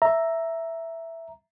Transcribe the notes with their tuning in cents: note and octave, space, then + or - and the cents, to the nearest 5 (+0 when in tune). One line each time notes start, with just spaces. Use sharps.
E5 +0 A#5 +0